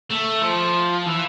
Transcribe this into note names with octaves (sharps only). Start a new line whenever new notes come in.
A3
F3
E3